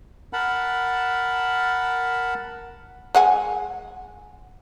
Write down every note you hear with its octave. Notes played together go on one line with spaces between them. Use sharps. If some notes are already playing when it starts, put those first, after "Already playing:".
A#4 F#5 A5 B5
G#3 F#5 G#5